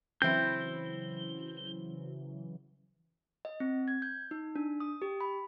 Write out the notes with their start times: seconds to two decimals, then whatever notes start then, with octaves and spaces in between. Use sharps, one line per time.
0.22 C#3 E3 F#3 C4 E4 G6
3.45 D#5
3.60 C4
3.88 G#6
4.02 G6
4.31 D#4
4.55 D4
4.80 D#6
5.02 G4
5.21 B5